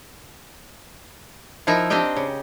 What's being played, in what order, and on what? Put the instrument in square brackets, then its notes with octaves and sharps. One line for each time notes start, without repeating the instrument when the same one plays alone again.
[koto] F3 D#4 E4 A#4 E5
C4 D4 G4 D#5 G5
C#3